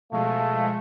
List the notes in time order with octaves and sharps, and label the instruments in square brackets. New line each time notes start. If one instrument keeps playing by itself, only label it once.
[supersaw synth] B2 F3 G#3 [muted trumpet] A3 [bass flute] F5